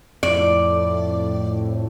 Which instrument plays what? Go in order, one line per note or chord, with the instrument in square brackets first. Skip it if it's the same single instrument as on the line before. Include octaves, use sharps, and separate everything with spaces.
[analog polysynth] F2 A2 [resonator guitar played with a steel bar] D5